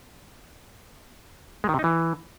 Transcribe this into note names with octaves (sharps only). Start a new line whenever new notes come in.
G#3
D#3
C3
D#4
E3